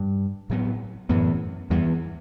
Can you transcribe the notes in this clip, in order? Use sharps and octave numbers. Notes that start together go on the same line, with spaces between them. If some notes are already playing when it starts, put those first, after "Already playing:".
Already playing: G2
A2 F#3 B3
F#2 A2 E3 B3
E2 G2 E3 B3